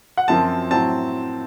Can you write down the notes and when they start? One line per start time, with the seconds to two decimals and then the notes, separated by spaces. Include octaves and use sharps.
0.17 F#5
0.28 F#2 F3 C4 A5
0.71 A2 F#3 C4 A5